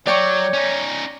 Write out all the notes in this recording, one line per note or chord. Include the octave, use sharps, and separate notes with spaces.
F#3 C#5 D5 G5 C#6
C#4 D#4